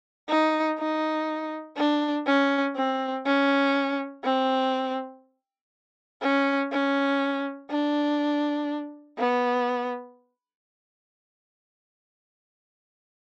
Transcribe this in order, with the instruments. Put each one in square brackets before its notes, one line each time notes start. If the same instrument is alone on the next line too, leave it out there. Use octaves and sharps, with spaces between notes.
[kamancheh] D#4
D#4
D4
C#4
C4
C#4
C4
C#4
C#4
D4
B3